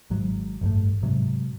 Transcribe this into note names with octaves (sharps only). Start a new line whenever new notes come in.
G#1 G#2 F#3
A1 G2 A3
G#2 C3 F#3